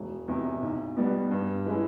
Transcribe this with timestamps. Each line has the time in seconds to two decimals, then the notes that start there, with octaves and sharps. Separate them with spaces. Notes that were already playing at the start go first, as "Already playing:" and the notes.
Already playing: E1
0.28 E2 C3 E3
0.62 B1
0.97 B2 G3 B3
1.31 G2
1.65 E3 G#3 C#4 E4